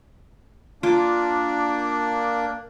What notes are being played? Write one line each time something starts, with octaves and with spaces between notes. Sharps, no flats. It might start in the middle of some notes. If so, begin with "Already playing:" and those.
A#3 D4 F4 D6